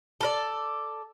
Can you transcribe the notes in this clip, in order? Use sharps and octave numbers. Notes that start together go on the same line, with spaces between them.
A4 A#4 D5